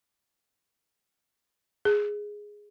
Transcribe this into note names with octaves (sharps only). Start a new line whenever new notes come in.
G#4